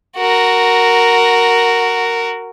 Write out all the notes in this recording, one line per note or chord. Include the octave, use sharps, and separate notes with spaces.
F#4 A#4